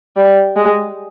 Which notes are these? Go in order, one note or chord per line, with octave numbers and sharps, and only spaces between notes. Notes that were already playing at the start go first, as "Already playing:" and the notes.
G3
G#3